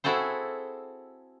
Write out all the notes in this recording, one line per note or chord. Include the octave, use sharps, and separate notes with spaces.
C4 E4 F#4 G#4 A4 C5